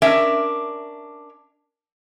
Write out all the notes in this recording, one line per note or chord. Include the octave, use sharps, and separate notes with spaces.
C#4 D4 A#4 E5